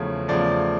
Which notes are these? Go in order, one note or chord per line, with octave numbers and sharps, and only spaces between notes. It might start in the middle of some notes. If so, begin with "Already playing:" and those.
Already playing: E2 C#3 F3 A3 C#5
E2 C#3 F3 A3 D5